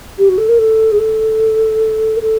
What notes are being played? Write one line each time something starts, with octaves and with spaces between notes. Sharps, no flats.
G4
F#4
A4
A#4
A4
G#4
A4
A#4
A4